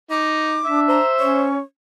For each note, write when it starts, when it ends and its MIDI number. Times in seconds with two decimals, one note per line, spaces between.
0.11 0.62 63
0.11 0.81 86
0.64 0.99 62
0.64 1.45 76
0.89 1.50 72
0.89 1.07 82
1.19 1.59 61
1.19 1.60 73